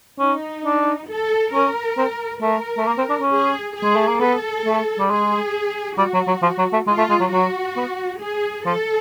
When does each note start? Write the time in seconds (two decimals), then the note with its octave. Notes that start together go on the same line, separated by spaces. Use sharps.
0.19 C#4 D#4
0.65 D4
1.09 A4
1.53 C#4 A#4
1.97 C4
2.42 A3 A#4
2.78 A3
2.87 A#3
2.98 C4
3.09 D4
3.21 C#4
3.32 G#4
3.76 G#4
3.83 G#3
3.96 A3
4.07 A#3
4.20 B3 A4
4.66 A3
4.99 G3
5.10 G#3 G#4
5.98 G3 F#4
6.14 F#3
6.28 F#3
6.42 F3
6.58 F#3
6.73 A3
6.87 G#3 F4
6.98 A3
7.10 G#3
7.20 F#3
7.32 F#3 F#4
7.77 B3
8.21 G#4
8.66 F3 A4